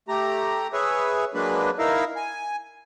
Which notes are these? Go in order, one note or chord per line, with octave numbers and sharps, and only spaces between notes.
A3 G4 A#5
G#4 B4 C#5 E5
F#3 G#3 A#3 D4 B4
D#4 E4 A#4 E5 F5
G#5